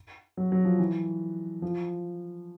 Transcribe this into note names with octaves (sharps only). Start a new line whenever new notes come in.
F#3
F#3
F3
E3
F3